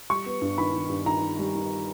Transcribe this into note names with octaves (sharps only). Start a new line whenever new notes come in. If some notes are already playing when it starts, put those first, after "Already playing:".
G3 C#6
B3
G2
D#3 B5
D#3
G2
D#3 A#5
D#3
G3
D#3